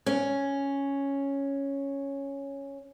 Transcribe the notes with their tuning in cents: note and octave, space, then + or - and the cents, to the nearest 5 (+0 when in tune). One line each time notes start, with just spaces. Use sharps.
C#4 +0